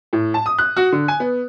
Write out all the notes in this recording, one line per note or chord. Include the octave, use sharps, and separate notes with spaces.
A2
A5
D#6
F#6
F#4
D3
G#5
B3